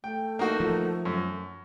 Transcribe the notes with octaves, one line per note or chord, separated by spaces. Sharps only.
A3 G5
A#3 D#4 F#4
F3
F#2